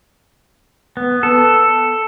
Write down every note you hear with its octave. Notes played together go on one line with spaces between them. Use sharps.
B3
A4